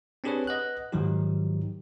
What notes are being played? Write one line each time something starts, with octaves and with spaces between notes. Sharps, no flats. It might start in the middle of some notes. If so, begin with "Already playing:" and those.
C4 D4 G4 G#4 B4 C#5
B4 D#5 F#5 F#6
G#2 D#3 F3 F#3 D#4 G4